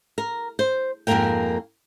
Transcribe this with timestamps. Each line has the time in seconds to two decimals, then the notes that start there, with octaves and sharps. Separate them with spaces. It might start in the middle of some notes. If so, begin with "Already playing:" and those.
0.18 A#4
0.59 C5
1.07 F2 G#2 B2 A#3 A#4 G5